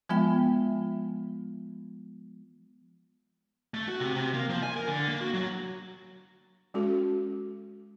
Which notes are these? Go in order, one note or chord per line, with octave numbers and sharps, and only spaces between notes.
F3 G#3 B3 F4 E5 G5
A3
F#4
C3
C3
A#3
F3
G#5
A#4
D3
A#3
F#4
F#3
G#3 C#4 F#4 A4